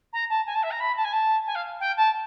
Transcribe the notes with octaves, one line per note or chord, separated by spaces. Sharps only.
A#5
A5
G#5
A5
E5
A#5
B5
A5
G#5
A5
G#5
F5
G5
A5